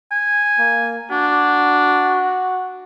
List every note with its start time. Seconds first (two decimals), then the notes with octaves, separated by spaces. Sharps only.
0.12 G#5
0.59 A#3
1.11 D4 F#4